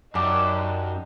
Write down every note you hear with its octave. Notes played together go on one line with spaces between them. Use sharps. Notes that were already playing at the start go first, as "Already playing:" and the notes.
F#2 D4 D#4 G4